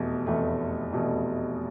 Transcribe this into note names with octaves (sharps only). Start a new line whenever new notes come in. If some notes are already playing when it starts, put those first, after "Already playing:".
Already playing: F1 E2 B2 A3
F1 E2 B2 A3
F1 E2 B2 A3